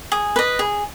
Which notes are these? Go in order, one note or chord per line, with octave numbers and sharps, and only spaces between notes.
G#4
B4 D#5
G#4